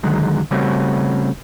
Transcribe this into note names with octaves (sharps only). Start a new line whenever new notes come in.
D#2 D3 D#3 F#3 G#3
C#3 G3 A3 C4 C#4 F#4